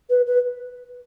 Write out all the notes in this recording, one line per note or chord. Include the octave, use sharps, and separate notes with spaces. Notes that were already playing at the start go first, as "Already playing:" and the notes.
B4
B4